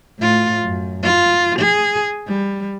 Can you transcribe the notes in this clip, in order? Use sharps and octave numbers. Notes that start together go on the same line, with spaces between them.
A2 F4
F#2
F4
G#4
G3